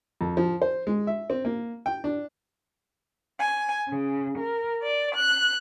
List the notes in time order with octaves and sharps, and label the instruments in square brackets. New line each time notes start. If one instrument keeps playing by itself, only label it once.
[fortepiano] F2
F3
C5
G#3
E5
C4
A#3
G5
D4
[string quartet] G#5
C#3
A#4
D5
F#6